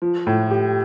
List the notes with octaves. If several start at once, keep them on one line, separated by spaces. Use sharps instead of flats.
F3
A2
G4